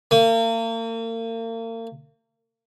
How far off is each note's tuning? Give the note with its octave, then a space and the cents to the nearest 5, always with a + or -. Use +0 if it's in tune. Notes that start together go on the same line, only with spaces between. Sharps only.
A#3 -40